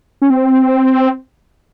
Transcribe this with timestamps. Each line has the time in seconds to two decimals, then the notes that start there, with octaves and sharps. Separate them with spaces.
0.22 C#4
0.30 C4